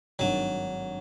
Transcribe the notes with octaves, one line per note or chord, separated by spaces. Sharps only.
G#1 G2 D#3 F#3